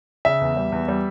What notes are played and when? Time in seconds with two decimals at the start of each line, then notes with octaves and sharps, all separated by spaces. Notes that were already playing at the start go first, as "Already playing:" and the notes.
0.25 C#3 E5
0.41 E2
0.57 G3
0.72 E2
0.88 G3